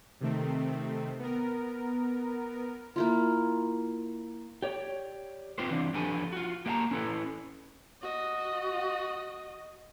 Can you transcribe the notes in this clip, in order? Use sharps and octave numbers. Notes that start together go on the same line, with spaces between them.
C3 D#3 A3 C4
B3 A#4
A#3 E4 F4
G4 C#5 D5
C4 F4 G4 B4 C5
E3 C4 D4
F3 D4 G4 A4 B4 G#5
F4 F#4
A#3 G4 E5 F5 A5 A#5
C#4 E4 A4 B4
F#4 D#5